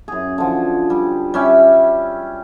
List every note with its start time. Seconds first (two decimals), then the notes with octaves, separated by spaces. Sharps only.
0.08 F#2 G#4
0.38 D3 F3
0.90 G3
1.34 G3 C#4 E5